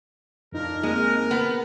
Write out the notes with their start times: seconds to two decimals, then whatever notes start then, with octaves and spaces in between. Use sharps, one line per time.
0.52 F2 D4 D#4 F4 A#4
0.83 G#3 A#3 C4 A#4
1.31 B3